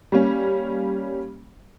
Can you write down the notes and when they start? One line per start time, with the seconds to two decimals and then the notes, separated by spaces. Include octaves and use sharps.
0.12 G3 A#3 C#4